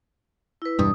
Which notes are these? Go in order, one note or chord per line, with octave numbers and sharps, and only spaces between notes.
E4 B4
E1 G2 D#6